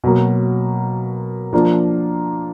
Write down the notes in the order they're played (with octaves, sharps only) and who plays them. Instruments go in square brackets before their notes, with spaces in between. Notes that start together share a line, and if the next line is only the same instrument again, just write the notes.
[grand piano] B2 F#3 A#3
F3 A#3 D4 F4